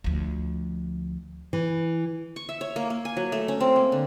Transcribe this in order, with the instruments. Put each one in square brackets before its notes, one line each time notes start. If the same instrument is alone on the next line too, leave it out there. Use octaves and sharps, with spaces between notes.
[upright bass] D2 F3
[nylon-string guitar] E3
[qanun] C#6
E5
C#5
A#3
A#3
G#5
F#3
A3
C#4
C4
A#3
D3